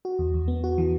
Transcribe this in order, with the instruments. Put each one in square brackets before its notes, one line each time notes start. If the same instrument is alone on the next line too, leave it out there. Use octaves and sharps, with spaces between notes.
[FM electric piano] F#4
E2
E2
B3
F#4
E3